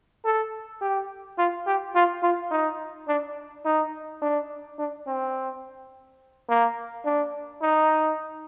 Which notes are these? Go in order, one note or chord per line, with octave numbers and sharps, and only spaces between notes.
A4
G4
F4
G4
F4
F4
D#4
D4
D#4
D4
D4
C4
A#3
D4
D#4